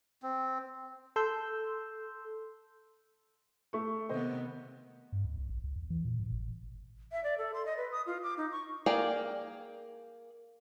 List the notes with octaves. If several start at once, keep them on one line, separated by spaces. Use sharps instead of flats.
C4
A4 C6 E6 G6
A3 C#6
C3 D#3 B3 C5 D#5
G2
D2
C2
A1
C#2
E2
E3
A#2
A2
G#1
E5
D5
A4
C6
D#5
B4
D#6
F4
D6
D#4
C#6
A#3 G#4 A#4 D5 G5